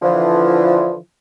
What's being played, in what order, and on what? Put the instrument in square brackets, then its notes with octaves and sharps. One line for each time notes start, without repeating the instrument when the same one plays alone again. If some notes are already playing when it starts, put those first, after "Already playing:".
[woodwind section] D3 E3 F3